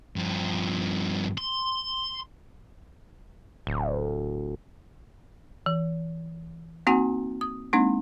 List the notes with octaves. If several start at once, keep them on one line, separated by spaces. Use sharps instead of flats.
G2 F3
C6
D1
E3
A#3 C4 D#4 F#4 F#5 G#5
D#6
G#3 A#3 C4 D4 D#4